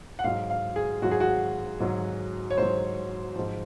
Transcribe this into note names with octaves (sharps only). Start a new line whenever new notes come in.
F#5
G#2 F#3 F5
F5
G#4
G#2 F#3 F#4
G#4
F#4
G#2 F#3
C#5
G#2 F#3 C5
G#2 F3